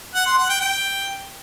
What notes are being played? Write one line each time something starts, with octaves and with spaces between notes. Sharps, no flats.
F#5
C6
F#5
G5
G5